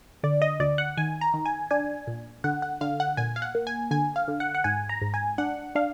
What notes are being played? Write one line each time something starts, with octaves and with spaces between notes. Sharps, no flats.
D3 D5
D#5
D2 D5
F#5
D#3 G#5
A#5
D#3
G#5
D4 G#5
A#2
D3 F#5
F#5
D3 F5
F#5
A#2 G#5
F5
F#5
A#3
G#5
D3 G#5
F5
D3
F#5
F#5
G#2 G#5
A#5
G#2
G#5
D4 F#5
D4 F5